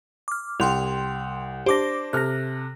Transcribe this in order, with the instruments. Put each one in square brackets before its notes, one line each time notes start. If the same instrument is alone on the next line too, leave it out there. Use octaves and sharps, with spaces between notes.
[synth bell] D6 F6
[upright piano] C2 [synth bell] G5 C6 F7
[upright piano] D4 C5 [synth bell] G4 D6 A#6
[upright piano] C3 A4 F6 [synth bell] F#6 A#6